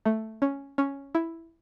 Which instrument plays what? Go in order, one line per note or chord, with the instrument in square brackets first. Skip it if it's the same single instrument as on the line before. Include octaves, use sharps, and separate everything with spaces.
[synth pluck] A3
C#4
C#4
E4